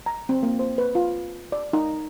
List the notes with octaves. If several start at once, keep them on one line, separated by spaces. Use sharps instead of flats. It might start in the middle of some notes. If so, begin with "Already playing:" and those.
A#5
C4
A#3
C5
B4
F4
D5
D#4